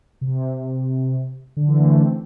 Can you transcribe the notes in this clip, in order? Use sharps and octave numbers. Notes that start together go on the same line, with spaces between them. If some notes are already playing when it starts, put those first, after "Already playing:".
C3
D3
E3
A3
A3
C4